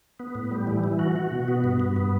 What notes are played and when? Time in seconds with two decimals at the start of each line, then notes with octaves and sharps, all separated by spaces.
0.20 B3
0.35 A2
0.51 G3
0.67 E3
0.84 E3
0.99 F#4
1.16 F#4
1.31 B2
1.48 B3
1.64 G2
1.80 G2
1.96 B3